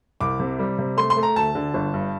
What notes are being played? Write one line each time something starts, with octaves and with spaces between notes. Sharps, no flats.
C2 D6
C3
G3
C3
A3 C6
C6
A3
A#5
D2 A5
D3
G1
G2